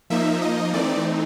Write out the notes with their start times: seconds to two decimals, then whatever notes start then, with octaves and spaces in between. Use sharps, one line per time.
0.10 F3 A#3 D#4 E5
0.42 D#5
0.73 E3 A3 C4 D#4 D5